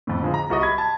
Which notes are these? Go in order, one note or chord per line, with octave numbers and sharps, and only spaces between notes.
F2 A2
D3 F3 G#3 C4
A#5
C2 F#4 D#5
B5 G#6
A5